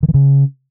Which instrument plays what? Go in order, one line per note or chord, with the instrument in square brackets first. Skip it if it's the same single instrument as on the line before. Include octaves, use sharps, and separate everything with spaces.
[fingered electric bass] D#3
E3
C#3